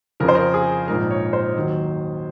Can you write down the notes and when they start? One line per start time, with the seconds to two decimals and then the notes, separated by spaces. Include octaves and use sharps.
0.20 F2 C#3 F3 A#4
0.28 C5
0.35 A#4
0.54 G#4
0.88 A#1 G#2 F3 A#4
1.11 C#5
1.33 C5
1.55 D#2 D#3 F#3